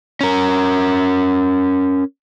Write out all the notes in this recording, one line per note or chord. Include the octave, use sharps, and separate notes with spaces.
C#4 A#4